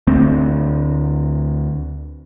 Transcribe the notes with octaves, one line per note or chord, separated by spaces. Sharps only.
D2 A3 C4